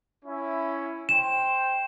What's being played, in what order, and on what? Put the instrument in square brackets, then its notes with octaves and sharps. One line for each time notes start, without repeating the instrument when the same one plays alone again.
[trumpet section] C#4 E4
[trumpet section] C5 G5 [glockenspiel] E7